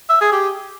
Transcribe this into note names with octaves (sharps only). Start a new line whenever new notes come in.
E5
G#4
G4